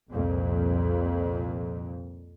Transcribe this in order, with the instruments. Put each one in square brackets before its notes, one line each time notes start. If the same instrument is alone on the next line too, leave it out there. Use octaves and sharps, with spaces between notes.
[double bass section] C2 F2 A#2